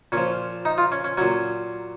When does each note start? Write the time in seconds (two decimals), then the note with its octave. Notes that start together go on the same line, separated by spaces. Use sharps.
0.12 A#2 F3 C#4
0.65 D#4
0.78 F4
0.92 C#4
1.04 C#4
1.18 A#2 F#3 C#4